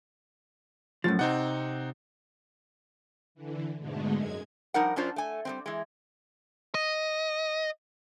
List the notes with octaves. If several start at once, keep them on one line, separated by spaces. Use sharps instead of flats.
F#2 A2 F3 A6
C3 C4 D#4 F#5
D3 E3
G#2 B2 D3 G#3 A3
F#2 G#3 G#6
F3 G3 D#4 A#4 F#5
F#2 C#4 D4 F4 C5
A3 G#5
G3 G#3 C4
E3 G#3
D#5